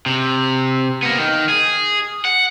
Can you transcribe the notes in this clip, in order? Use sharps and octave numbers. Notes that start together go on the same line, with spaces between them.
C3
A#3 B3
D#3
G#4
F#5